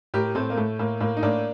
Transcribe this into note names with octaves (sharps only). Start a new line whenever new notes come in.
A2 G4 A#4
A2 A3 C4
A#3
A2 A3
A2 A#3
A2 A#3
D#4
A2 A#3 D4